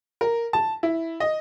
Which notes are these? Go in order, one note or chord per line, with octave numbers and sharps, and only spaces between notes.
A#4
A5
E4
D#5